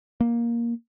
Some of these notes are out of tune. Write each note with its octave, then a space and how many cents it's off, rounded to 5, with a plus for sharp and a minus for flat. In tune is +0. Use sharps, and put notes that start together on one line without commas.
A#3 +10